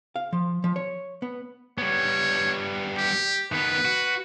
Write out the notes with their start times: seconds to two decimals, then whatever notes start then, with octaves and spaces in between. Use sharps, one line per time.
0.16 F5
0.33 F3
0.64 F3
0.76 C#5
1.22 B3
1.78 G3 B3 C#5
2.97 G4
3.52 D#3 B3 B4
3.85 F#4